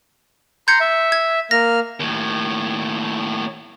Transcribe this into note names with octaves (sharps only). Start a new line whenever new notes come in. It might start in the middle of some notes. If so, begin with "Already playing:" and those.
A#5 C6 G6 G#6 C#7
E5
G#6
A#3 F6 A#6
D#2 A2